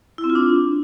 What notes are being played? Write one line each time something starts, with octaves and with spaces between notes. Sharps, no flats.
E4
C4
F4
D4